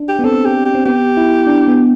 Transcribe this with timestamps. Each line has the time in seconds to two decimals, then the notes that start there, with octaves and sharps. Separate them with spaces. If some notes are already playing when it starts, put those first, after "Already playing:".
Already playing: D4
0.09 G4
0.19 B3
0.24 C4 A4
0.45 G4
0.65 G4
0.75 C4
0.86 B3 G4
1.17 E4
1.47 D4
1.68 B3